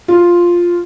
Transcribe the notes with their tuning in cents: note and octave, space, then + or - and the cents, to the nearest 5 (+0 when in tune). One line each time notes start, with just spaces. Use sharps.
F4 +0